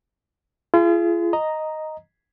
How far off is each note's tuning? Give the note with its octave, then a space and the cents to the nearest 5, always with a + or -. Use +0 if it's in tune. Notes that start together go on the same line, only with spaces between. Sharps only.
F4 -40 G#4 +15
D#5 +0 A#5 +0